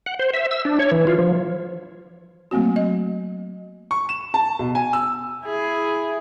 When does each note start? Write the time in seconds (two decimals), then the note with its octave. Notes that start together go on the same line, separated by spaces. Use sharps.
0.06 F#5
0.19 C5
0.33 E5
0.51 E6
0.65 D4
0.79 C#5
0.91 E3
1.07 F4
1.19 F3
2.51 F#3 A3 A#3 C4 F#4
2.76 D#5
3.91 C#6
4.09 E7
4.34 A5
4.59 B2
4.75 G#5
4.93 E6
5.46 E4 G#4